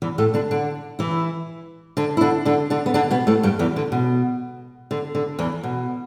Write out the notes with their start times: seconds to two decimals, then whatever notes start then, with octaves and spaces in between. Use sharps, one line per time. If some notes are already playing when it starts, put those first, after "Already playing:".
0.02 E2 E3
0.18 A2 A3
0.34 D3 D4
0.51 D3 D4
0.99 E3 E4
1.97 D3 D4
2.17 E4
2.21 D3 D4
2.45 D3 D4
2.70 D3 D4
2.86 B3
2.94 D3 D4
3.11 B2 B3
3.27 A2 A3
3.43 G2 G3
3.59 E2 E3
3.76 D3
3.92 B2
4.91 D3
5.15 D3
5.39 E2 E3
5.64 B2